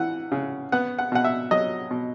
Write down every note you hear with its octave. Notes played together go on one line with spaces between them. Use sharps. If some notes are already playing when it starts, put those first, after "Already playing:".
Already playing: E3 F#5
C#3
B3 F#5
F#5
B2 F#5
E5
F#3 D#5
B2